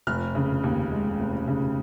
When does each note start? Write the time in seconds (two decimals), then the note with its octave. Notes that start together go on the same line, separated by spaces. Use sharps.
0.07 F1 F6
0.35 C#3
0.64 D#2
0.91 G#3
1.20 F1
1.48 C#3